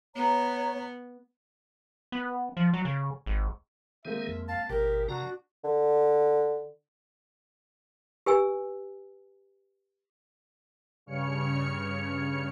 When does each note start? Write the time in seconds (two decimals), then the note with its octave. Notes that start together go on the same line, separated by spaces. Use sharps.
0.16 B3 C#5 A#5
2.12 B3
2.57 F3
2.73 F#3
2.85 C#3
3.26 G#1
4.05 D#3 G#3 A#3 C4 G#4 E5
4.28 F2
4.48 F5 A5
4.70 G#1 B2 G4 A#4
5.09 C3 D4 F#4 A#5
5.64 D3
8.26 G4 B4 G#5 E6
11.06 G2 C#3 C#5 F6 C#7